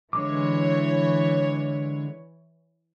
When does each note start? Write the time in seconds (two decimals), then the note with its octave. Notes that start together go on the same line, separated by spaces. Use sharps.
0.13 D3 E3 G#3 C#5 D6